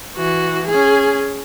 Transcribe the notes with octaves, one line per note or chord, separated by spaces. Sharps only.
E3 F#4
C#4 G#4